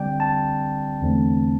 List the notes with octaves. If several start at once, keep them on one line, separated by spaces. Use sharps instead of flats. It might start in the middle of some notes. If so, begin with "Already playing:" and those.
Already playing: D3 G3 C4 D5 G5
A5
E2 D3 A3 C4